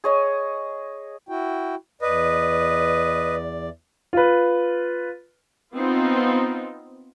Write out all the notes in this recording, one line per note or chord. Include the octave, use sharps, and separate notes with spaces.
G#4 C#5 D#5
E4 F#4 G5
E2 B4 D5 D#5
F4 B4
B3 C4 D#4 F4